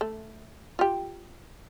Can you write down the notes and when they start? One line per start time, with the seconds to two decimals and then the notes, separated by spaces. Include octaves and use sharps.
0.01 A3
0.79 F4 G4